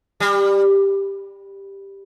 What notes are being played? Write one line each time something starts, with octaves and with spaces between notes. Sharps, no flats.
G3